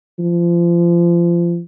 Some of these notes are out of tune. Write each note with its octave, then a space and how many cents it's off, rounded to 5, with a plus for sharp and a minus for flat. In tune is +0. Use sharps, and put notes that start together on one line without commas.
F3 -30